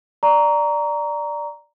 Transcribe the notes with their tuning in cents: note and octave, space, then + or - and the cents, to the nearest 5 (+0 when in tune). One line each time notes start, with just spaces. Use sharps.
D5 +0 A#5 +0 C#6 +40